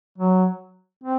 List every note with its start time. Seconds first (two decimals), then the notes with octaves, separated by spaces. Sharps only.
0.18 F#3
1.04 C4